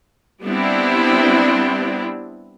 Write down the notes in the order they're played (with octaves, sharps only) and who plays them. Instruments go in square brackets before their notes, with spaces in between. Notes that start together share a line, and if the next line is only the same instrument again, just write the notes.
[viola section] G3 B3 C4 D4 E4